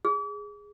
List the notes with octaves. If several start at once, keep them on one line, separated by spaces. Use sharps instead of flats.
G#4